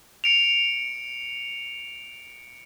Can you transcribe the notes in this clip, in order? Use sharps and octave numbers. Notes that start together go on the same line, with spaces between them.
C#7 D7 F7